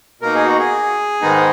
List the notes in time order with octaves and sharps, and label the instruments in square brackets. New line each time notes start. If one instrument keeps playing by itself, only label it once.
[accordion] B2 A#3 D#4 A#4
G#4
F#4
G#4
G#2 D#3 G#3 B3 D#4